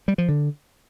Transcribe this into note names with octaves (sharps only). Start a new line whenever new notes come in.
G3
F3
D3